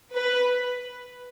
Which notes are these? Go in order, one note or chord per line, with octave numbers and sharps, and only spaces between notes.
B4